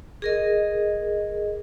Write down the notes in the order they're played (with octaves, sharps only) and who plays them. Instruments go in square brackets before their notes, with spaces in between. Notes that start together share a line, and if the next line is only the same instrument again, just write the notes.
[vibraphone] G#4 A#4 D#5